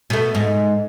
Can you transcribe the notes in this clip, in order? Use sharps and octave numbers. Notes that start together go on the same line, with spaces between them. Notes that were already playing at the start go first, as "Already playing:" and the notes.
B2 A3
G#2